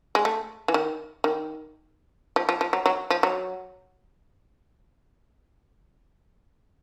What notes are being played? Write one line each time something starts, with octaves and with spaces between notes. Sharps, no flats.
G#3
A3
E3
D#3
D#3
F3
F3
F3
F#3
F#3
F3
F#3